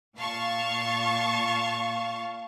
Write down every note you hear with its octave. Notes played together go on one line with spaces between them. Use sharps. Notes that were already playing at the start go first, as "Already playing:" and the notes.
A#2 F5 A5 C#6